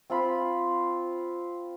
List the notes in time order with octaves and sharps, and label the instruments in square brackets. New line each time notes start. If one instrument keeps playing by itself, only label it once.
[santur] C4 F4 B5